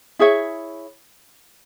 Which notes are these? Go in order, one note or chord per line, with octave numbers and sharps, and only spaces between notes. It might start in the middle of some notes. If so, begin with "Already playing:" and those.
E4 G#4 C#5 E5